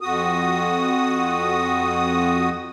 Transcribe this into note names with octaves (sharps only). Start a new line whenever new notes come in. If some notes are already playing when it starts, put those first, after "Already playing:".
F2 F#4 D#6